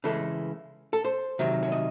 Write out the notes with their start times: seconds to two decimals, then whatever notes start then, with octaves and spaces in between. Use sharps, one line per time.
0.04 C#3 E3 G#3 A4
0.93 A4
1.05 C5
1.39 C3 D#3 F#3
1.63 C#5
1.72 D#5